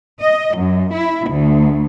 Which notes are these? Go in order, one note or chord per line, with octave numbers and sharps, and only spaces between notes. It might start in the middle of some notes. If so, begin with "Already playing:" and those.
D#5
F#2
E4
D2